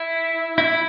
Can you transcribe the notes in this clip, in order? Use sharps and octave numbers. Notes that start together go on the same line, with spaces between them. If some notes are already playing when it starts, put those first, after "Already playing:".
Already playing: E4
E4